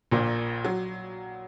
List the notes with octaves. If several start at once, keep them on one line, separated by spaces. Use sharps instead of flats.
A#1 A#2 A#3
F#3